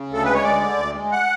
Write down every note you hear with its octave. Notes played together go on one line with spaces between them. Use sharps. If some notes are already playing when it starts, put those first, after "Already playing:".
Already playing: C#3
D2 A4
G#3 B4
C#5
D2 D5
D3
D2
G#3
F#5